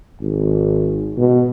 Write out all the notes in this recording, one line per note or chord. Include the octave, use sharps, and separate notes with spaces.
G#1
B2